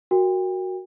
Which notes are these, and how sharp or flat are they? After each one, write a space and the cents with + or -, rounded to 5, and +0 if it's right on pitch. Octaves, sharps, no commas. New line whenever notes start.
F#4 +0 A#4 +0 G5 +35